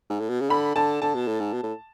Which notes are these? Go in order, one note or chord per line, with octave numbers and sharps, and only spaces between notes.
G#2
A2
B2
C#3
D3 B5
D3 A5
D3 A5
B2
A2
G#2
B2
A2